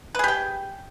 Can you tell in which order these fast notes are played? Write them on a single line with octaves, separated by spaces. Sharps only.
B4 G#4 G4 G5